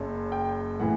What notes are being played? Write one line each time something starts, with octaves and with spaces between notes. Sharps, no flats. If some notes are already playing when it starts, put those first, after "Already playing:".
Already playing: F#1 F#2
G5
A2 E3 F#5